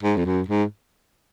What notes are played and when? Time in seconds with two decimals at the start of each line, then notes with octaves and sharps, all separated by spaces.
0.03 G#2
0.17 F2
0.25 F#2
0.48 G#2